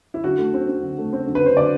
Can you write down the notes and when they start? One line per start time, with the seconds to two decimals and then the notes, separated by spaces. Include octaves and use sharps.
0.14 E4
0.24 D3 F#4
0.38 A3
0.54 C4
0.68 C4
0.83 D3
0.98 A3
1.13 C4
1.27 D3
1.35 B4
1.43 D3 C5
1.57 D3 D5